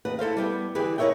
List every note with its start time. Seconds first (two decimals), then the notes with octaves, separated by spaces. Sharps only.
0.05 D#2 B4 F#5
0.19 E4 A4 C5 F5
0.37 G3 B3 G4
0.75 D3 E3 G4 G#4 B4
0.98 D#4 E4 A#4 C#5 E5 G5